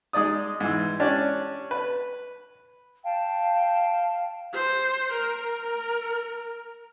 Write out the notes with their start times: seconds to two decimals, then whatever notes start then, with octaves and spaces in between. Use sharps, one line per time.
0.13 G#3 D#4 D5 D#6
0.60 G#2 E3
1.00 C#4 D4 G4 D5
1.71 B4
3.04 F5 G5 A5
4.53 C5
5.12 A#4